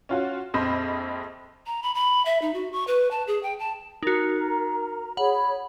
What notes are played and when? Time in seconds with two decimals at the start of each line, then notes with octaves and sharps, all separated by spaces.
0.09 C#4 F4 F#4
0.54 A#1 F2 C4 D#5 B5
1.67 A#5
1.83 B5
1.95 B5
2.25 E5
2.42 D#4
2.54 F#4
2.72 C#6
2.87 B4
3.11 A5
3.27 G#4
3.43 G5
3.59 A5
4.03 D#4 F#4 A#4 A#5
5.17 G#4 C#5 F#5 B5